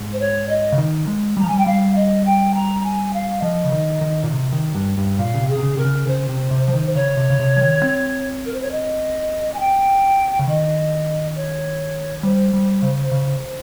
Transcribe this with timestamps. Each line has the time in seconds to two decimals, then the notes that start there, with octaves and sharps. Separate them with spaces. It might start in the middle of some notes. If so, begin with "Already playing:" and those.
Already playing: G#2
0.12 C5
0.19 C#5
0.49 D#5
0.72 C#3
0.78 D#3
1.07 G#3
1.37 G3
1.39 F3 A#5
1.47 G3 G#5
1.58 G5
1.66 G3 F5
1.95 D#5
2.25 G5
2.54 A#5
2.84 G#5
3.13 F5
3.42 F3 D#5
3.64 C#3
3.72 D#3
4.01 D#3
4.23 A#2
4.31 C3
4.53 D#3
4.75 G2
4.97 G2
5.18 A#2 F5
5.34 C#3
5.40 C3
5.48 G#4
5.56 C3
5.63 C#3
5.77 C3 A#4
5.85 C#3
6.07 C#3 C5
6.29 C3
6.51 C3
6.68 F3
6.73 D#3
6.95 C#3 C#5
7.17 C3
7.30 C#3
7.39 C3
7.56 F3
7.61 D#3
7.83 C4
8.45 A#4
8.53 C5
8.62 C#5
8.71 D#5
9.54 G#5
9.59 G5
10.39 C#3
10.47 D#3 D#5
11.35 C#5
12.23 G3 C5
12.53 G3
12.82 C#3
13.12 C#3